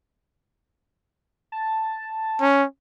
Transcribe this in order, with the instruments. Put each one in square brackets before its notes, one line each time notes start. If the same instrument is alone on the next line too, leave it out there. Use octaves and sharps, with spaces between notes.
[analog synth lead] A5
[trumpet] C#4